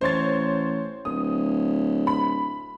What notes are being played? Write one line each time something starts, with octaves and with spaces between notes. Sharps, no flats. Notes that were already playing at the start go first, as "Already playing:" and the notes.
A1 C5 C#5 A6
D1 D#6
B5